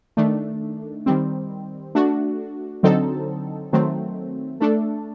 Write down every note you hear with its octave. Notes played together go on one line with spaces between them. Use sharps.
D#3 A3 D4
D#3 G3 C4
A3 D4 F#4
D3 F#3 C4 D#4 A4
D#3 F#3 A3 C4
A3 D4 A4